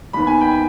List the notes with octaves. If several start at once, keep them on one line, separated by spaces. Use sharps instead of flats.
D#2 D#3 B3 B5
G#5
G5 B5